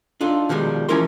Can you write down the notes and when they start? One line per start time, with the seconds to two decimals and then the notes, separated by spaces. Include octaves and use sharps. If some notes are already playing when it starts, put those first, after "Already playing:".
0.21 D4 D#4 F4 A4
0.49 B2 D#3 F3 G3 G#3
0.89 E3 F3 C#4 E4 A#4 C6